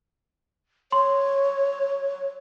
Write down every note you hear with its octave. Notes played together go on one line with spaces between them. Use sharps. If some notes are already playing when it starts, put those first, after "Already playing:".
C#5 C6